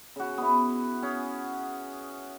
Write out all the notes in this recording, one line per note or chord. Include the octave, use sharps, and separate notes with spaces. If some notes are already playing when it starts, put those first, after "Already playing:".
C#3 F#4
B3 E4
C#4 G#4